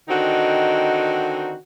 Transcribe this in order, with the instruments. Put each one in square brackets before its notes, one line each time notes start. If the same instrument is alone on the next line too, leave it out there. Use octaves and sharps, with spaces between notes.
[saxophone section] D3 D#3 C4 D#4 F#4